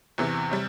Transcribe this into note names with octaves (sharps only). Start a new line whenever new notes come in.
E2 C3 E3
C3 G3